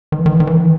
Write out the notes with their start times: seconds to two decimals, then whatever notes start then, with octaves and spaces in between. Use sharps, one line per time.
0.12 D#3
0.19 E3
0.26 D#3
0.33 E3
0.40 D#3
0.47 E3
0.55 D#3
0.61 E3